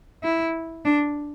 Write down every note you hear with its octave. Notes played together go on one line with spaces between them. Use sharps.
E4
D4